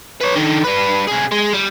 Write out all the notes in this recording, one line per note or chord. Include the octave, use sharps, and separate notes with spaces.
B4 C#5
D3 D#3
G3 B4
C3 G#4
G#3
G3